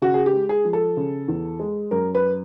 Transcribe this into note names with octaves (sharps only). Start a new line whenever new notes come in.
C#3 F#4
G#4
G4
G#3
G#4
F3
A4
C#3
E2
G#3
F#2 A#4
B4